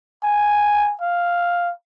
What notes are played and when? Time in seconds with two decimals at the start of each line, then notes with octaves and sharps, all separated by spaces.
0.23 G#5
1.01 F5